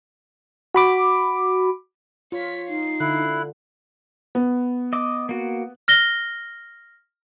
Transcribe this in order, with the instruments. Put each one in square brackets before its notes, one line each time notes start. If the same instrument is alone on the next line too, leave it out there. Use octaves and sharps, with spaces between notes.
[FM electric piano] F#4 B5 D6
[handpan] F4 [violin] C#5 B6
[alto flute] D#4 [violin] C7
[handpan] D3 [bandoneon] E4 F#6
[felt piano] B3
[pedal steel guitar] D#5 D6
A#3 F#4
[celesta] F6 A#6 G7